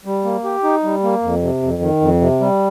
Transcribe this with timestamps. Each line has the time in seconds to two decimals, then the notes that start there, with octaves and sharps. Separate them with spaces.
0.05 G3
0.25 A#3
0.44 G4
0.64 D#4
0.83 G3
1.03 A#3
1.23 F2
1.42 C3
1.62 F2
1.82 D#3
2.01 F2
2.21 C3
2.41 G3